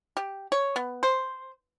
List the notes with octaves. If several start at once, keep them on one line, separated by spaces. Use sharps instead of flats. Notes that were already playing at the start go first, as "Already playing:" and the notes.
G4
C#5
B3
C5